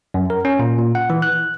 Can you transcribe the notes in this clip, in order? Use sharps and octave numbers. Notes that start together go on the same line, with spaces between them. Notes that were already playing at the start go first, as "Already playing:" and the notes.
F#2
A#4
C#4
A#2
A#2
F#5
E3
F#6